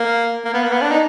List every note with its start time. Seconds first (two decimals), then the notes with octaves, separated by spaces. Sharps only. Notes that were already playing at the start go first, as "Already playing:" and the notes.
Already playing: A#3
0.45 A#3
0.54 B3
0.64 A#3
0.72 B3
0.82 D4
0.91 D#4